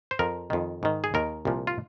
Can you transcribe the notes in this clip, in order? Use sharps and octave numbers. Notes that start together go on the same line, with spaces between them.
C5
F2 F3 A#4
F2 D#3
G#2 D#3
G#4
D#2 D#3 A#4
C2 A#2 F3
F4